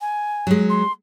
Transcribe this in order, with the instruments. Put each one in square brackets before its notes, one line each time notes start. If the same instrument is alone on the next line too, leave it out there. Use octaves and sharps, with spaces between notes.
[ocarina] G#5
[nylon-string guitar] F#3 G#3
[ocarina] C6